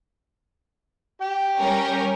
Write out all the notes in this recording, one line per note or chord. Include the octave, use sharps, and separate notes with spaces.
G4 G5
G3 C#4 A#4